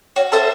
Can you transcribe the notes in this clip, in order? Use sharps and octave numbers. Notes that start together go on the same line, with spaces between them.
F#4 C#5
A4 C5 E5 A5